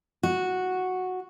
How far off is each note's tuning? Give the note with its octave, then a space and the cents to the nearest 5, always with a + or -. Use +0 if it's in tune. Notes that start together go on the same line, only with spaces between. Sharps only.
F#4 -5